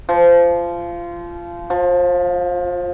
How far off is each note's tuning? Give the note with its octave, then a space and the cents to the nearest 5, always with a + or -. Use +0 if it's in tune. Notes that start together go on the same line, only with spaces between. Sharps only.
F3 -20
F3 +25